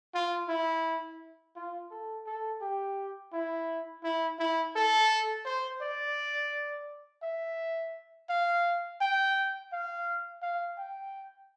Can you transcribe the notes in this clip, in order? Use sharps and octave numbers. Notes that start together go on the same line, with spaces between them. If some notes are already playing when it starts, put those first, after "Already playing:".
F4
E4
F4
A4
A4
G4
E4
E4
E4
A4
C5
D5
E5
F5
G5
F5
F5
G5